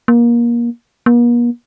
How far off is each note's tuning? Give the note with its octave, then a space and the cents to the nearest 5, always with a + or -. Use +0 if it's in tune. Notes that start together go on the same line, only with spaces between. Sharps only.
A#3 +25
A#3 +45